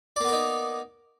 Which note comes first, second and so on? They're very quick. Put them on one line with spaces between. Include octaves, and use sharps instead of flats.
D5 A#3 B3 A#4 D#4